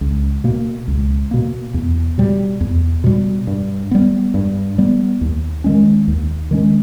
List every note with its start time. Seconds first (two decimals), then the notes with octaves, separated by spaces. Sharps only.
0.01 C#2
0.44 B2 A#3
0.88 C#2
1.31 B2 A#3
1.74 E2
2.18 B2 G3
2.61 E2
3.04 B2 G3
3.47 G2
3.91 G3 B3
4.34 G2
4.78 G3 B3
5.21 D#2
5.64 D#3 G#3 C#4
6.08 D#2
6.51 D#3 G#3 C#4